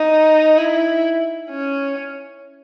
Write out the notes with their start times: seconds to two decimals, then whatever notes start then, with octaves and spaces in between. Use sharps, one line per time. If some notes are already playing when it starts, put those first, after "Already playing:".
Already playing: D#4
0.58 E4
1.50 C#4